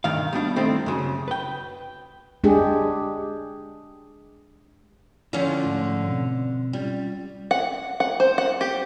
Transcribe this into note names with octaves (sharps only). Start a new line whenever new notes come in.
B1 G2 D#3 F5
G3 B3 D4 F#4
D#3 G3 A3 C4 E4
F#2 C#3 F#3
B4 G5
G#3 D4 G4 G#4
D3 F3 C#4 E4 F4 G5
G#2 A3
B2 C4
G3 C#4 F4
F#5
F#5
C5
F#5
G4